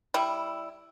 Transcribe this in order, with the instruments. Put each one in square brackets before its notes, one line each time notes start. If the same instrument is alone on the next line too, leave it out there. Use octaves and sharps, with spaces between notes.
[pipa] G3 E4